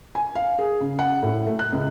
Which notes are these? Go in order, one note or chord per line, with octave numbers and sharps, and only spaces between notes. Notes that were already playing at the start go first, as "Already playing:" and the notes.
G#5
F5
G#4
C#3
F#5
A2
A3
F#6
C#2